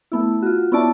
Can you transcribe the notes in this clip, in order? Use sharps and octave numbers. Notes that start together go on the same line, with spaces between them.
A3 B3 E4
F4 F#4
B3 C#4 E4 D5 A5